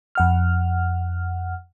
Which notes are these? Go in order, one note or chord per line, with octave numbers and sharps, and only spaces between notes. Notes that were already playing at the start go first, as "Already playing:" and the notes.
F2 F#5 F6